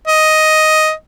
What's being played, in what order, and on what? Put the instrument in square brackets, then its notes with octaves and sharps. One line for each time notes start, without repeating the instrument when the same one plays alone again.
[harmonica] D#5